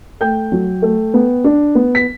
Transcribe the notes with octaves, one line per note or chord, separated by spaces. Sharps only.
A3 G5 G6
F#3
A3
B3
D4
B3
B6